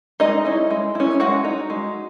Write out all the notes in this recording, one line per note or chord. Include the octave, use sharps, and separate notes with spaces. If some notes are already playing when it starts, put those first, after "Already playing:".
G#3 D#4 D#5
C#4 E4
G#3
C#4 E4
G#3 F#4 F#5
D#4
G#3